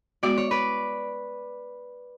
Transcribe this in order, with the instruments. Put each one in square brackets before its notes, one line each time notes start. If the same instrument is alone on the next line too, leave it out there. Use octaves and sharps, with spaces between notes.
[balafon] G#3 B3 F#4 [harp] D5
[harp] C#5
B4 D5